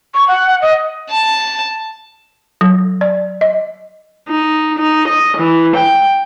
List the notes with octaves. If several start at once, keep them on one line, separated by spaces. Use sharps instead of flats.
C#6
F#5
D#5
A5
F#3
D5
D#5
D#4
D#4
D#5
E3
G5